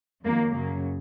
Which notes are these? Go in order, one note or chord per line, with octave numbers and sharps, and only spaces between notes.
F2 D#3 F#3 A#3
F#2 C#3 F#3 A#3